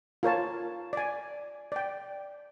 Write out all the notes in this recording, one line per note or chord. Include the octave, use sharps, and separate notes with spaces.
F4 A#4 C#5 A5
D5 G#5
D5 G5